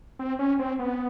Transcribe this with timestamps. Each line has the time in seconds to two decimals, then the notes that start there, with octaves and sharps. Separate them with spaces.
0.19 C4
0.39 C#4
0.59 C4
0.79 B3